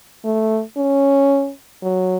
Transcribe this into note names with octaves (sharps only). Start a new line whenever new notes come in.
A3
C#4
F#3